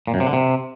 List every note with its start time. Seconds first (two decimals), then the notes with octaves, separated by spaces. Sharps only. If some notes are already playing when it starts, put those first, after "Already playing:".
0.07 A#2
0.14 F#2
0.20 C3
0.27 D3
0.33 C3